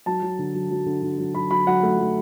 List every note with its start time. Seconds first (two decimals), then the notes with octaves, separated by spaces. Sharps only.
0.06 F#3 A5
0.23 F#3
0.39 D3
0.55 F#3
0.71 F#3
0.86 D3
1.02 D3
1.18 F#3
1.34 F#3 B5
1.50 F#3 B5
1.67 F#3 F#5
1.83 A3
1.99 F#3